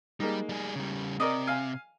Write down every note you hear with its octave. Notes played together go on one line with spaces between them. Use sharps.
G3 G#3 A#3 D#4
G3 G#4
C#3 G3
C3 A#4 D5 D#5
F5 G#5